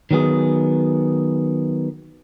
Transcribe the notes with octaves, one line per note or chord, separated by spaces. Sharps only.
D#3 F#3 B3 G#4